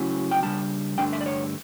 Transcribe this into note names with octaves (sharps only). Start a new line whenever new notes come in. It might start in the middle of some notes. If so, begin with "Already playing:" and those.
Already playing: C#3 F#3 A3 C#4 E4
G5
C#3 G3 D4 A5
G2 D3 A3 D4 G5
E5
D5
C#5